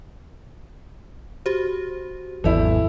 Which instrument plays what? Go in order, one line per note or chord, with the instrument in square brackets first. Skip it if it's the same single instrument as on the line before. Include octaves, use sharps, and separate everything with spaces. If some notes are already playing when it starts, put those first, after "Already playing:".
[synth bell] F#4 G4 C5
[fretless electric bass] G#1 E2 [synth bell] F#3 D5 [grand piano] E4 A4